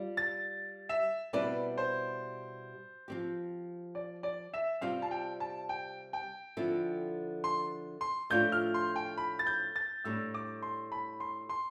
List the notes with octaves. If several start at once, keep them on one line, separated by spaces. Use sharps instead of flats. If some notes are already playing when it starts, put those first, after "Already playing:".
Already playing: G3 F4
A6
E5
B2 G3 C4 E4 B4 D5
C5
F3 C4 G4
D5
D5
E5
C3 G3 C4 F4 C5 F5
A5
G5
A5
G5
G5
D3 F3 C4 E4 A4
C6
C6
A2 F3 A3 D4 F4 G6
F6
C6
G5
B5
A6
G6
A6
A2 G3 D4 E6
D6
C6
B5
C6
C6